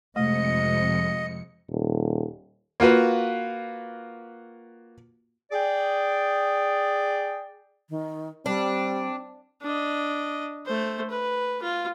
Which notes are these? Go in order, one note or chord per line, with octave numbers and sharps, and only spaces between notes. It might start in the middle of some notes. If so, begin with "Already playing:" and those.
F2 C3 G#3 A3 D#5 C#7
D#1
A#3 F4 F#4 B4
G#4 D5 G5
D#3
G3 C4 D4
D4 D#5
A3 C5
B4
F4